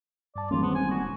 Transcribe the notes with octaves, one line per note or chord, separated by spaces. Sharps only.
G2 D5 A5
D#1 E3 G#3 A#3 C#4 F4
B3 C4
G#5
F#4